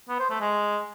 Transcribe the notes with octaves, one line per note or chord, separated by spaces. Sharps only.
B3
C5
A3
G#3